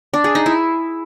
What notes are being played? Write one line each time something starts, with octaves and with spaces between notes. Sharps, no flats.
D4
G#4
D#4
E4